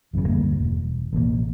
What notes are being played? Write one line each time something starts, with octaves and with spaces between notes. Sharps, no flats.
G#1 F#2 A#2 C#3
D2 G2 G3 A#3
E1
A1 B2 D3 A#3